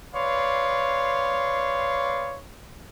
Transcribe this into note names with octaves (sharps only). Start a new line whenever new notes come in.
B4 C#5 D5 F5 C6